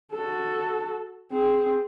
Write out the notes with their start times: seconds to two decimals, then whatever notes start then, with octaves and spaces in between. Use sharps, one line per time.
0.12 F#4 A4
1.32 C4 G#4